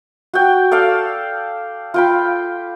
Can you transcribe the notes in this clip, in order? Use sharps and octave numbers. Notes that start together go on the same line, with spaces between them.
F#4 G5
A4 D5 F5
F4 G5 B5